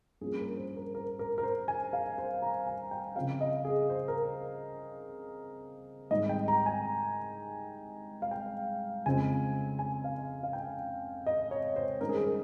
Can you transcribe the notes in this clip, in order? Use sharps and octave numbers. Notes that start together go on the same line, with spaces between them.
G2 F3 A#3 C#4 G#4
A#4
C5
A#4
A#4
A#4
A#4
C5
G#5
F5
C5
A#5
G#5
G5
C#3 F3 C4 F5
D#5
G#4
C5
A#4
G#2 D#3 G3 C4 D#5
G5
A#5
G#5
F5
G5
F2 C#3 F3 G#3 C4 G#5
G#5
F5
F5
G5
D#5
C#5
C5
G2 D#3 G#3 C#4 A#4
G#4
A#4